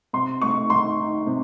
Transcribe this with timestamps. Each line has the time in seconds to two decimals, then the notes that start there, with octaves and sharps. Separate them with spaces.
0.13 C3 C6
0.42 A3 C#6
0.70 D#3 C6
0.98 D#4
1.27 C3